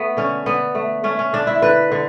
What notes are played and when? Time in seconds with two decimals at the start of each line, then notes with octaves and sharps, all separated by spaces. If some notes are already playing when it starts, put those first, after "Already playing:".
Already playing: A3 B3
0.17 D3 C#4
0.46 D3 B3
0.75 A3
1.04 A3 C#4
1.19 C#4
1.33 D3 D4
1.47 E4
1.62 D3 B4
1.92 D3